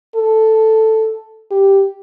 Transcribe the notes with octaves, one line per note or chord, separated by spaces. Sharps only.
A4
G4